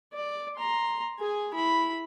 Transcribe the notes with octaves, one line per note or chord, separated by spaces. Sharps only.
D5
A#5 C6
G#4 G#5
E4 B5